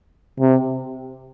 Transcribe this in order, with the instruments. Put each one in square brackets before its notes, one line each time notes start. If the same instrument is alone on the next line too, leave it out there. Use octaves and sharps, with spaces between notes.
[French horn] C3